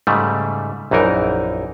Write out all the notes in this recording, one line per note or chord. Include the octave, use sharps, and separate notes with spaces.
G#2 C#3 G3 A3
A#1 F#2 E3 D#4 A#4